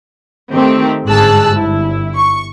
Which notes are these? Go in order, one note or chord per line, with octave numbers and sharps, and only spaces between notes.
D#3 A3 C4 G4
G1 G#2 G#4 A5 E6 F#6
G1 E4
C#6